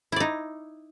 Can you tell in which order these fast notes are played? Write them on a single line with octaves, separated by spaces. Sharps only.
E4 D5 D#4